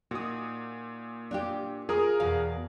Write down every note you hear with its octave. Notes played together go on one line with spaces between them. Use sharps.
A#2 D#4 F#4 D#6
D4 F4 G4
F4 G#4 A#4 D#6
E2 B2 F5